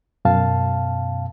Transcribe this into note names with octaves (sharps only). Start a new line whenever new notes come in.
F#2 B2 F5 A5